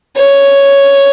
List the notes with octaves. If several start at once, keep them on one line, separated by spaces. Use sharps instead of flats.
C#5